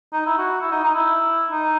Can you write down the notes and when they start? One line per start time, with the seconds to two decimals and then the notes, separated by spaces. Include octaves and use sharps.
0.13 D#4
0.26 E4
0.38 F#4
0.61 E4
0.71 D#4
0.83 D#4
0.95 E4
1.51 D#4